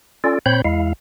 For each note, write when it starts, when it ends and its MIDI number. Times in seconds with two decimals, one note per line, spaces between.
0.24 0.39 61
0.24 0.39 65
0.24 0.39 69
0.24 0.39 74
0.46 0.62 46
0.46 0.62 60
0.46 0.62 72
0.46 0.62 73
0.46 0.62 83
0.46 0.62 91
0.64 0.93 40
0.64 0.93 56
0.64 0.93 64
0.64 0.93 77